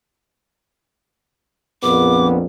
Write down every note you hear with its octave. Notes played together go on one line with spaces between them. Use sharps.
A#1 F2 B3 D6